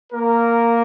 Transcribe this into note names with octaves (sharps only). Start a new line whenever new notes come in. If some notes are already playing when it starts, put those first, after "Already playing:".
A#3 A#4